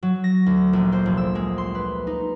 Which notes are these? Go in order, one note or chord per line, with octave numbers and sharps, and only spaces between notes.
F#3
A#6
D2
A#1
C5
F1
E6
G#3
C6
B4
D#4